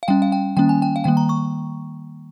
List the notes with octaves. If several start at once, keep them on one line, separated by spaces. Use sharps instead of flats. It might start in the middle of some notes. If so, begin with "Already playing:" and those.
F5
G3 C#4 G5
F5
G5
D#3 G3 A#3 C#4 G5
G#5
G5
F5
D#3 G3 A#3 G5
A#5
C#6